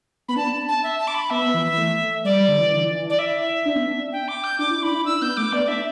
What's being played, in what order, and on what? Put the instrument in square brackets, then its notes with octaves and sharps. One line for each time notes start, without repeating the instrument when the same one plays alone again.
[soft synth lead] B3 [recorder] B5
[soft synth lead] D4 [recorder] A5
[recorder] A5
E5
A5
D6
B5
[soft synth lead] B3 [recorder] E5
[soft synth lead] B3
E3
E3
A3
[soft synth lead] G3 [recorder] D5
[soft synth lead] G3
D3
E3
D3
E3
E3
D4
[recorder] D5
[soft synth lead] E4 [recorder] E5
[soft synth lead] D4
B3
D4
[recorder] G5
D6
G6
[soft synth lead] D4 [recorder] D6
[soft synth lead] E4
[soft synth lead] D4 [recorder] B5
[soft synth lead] E4
[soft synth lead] D4 [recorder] E6
[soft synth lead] B3 [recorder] G6
[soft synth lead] A3 [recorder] D6
[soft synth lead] B3 [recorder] D5
[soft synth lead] D4 [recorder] E5